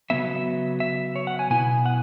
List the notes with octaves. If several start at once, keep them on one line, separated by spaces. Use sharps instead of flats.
C#3 F#3 B3 E5
E5
C#5
F#5
G#5
B2 B3 E4 G#5
F#5